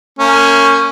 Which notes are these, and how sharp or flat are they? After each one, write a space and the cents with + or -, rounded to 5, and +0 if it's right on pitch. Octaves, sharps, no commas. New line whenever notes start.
A#3 -25 C#4 +0